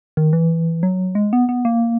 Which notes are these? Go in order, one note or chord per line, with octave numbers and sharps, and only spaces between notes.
D#3
E3
F#3
G#3
B3
B3
A#3